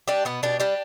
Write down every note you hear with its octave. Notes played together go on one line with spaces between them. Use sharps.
G3 D4 G4
B2 B3
B2 D4 G4
G3 D4 G4